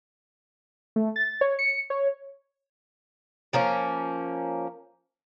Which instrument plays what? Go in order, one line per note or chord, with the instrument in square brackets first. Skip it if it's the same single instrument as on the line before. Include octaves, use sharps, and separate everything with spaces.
[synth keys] A3
A6
C#5
C#7
C#5
[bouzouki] F3 A#3 C#4